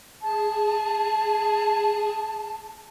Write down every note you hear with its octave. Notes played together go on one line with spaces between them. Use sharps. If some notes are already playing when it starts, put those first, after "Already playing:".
G#4 A5